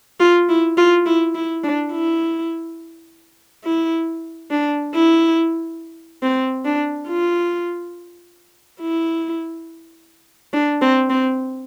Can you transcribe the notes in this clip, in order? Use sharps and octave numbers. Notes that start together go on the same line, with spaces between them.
F4
E4
F4
E4
E4
D4
E4
E4
D4
E4
C4
D4
F4
E4
D4
C4
C4